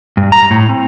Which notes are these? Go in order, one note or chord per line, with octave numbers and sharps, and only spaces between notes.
G2
A#5
A2
C4